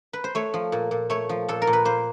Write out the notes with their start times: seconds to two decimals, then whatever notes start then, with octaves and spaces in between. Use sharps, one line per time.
0.13 B4
0.24 C5
0.35 A3 C#5
0.54 F3
0.72 A#2
0.91 A#2
1.10 A3 C#5
1.29 F3
1.48 A#2 A4
1.62 A#4
1.67 A#2
1.73 B4
1.85 A#3 C5